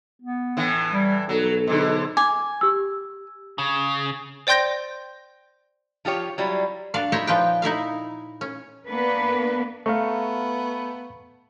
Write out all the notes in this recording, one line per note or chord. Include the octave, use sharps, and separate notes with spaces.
B3
A2 E3
G3
B1 F#3 A4
G#2 D3
G#5 D6
G4 E6
C#3
C5 D5 G5 C6 G6 A#6
F3 F4 G4 C#5
F#3 G3 E4 F4
D4 F#4 F5
D#4 E4 C5 C#5 D#5 E5
A#2 F3 B4 G5
D#4 E4 E5 F5
C#4
A#3 B3 D4 B4
A3 B3 F5 A#5 C#6